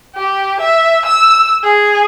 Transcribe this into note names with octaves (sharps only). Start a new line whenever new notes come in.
G4
E5
E6
G#4